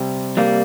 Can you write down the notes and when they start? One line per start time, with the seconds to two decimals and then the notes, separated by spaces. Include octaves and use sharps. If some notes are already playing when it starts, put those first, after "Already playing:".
Already playing: C3 G3 C4
0.37 G3 A#3